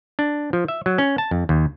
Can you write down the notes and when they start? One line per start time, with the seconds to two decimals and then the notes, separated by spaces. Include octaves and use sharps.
0.19 D4
0.53 F3
0.68 E5
0.86 F#3
0.98 C#4
1.18 A5
1.31 F2
1.49 D#2